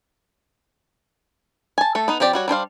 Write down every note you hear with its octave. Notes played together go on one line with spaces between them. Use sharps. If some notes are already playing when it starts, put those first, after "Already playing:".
G#5 A5
A3 A4
B3 D#4
F3 C4 G4 D5
G3 F#4 C#5
G3 D4 C5 F5